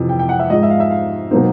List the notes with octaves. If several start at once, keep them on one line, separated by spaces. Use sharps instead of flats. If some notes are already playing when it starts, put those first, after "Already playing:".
Already playing: F2 C3 E3
G5
G5
F#5
E5
G#2 F3 G#3 D#5
E5
F5
E5
F5
B2 F#3 A#3 D#4 C5